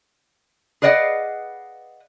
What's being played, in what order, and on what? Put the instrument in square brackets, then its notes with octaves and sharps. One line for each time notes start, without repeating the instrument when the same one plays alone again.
[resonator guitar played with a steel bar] G#4 B4 D5 D#5 F5 F#5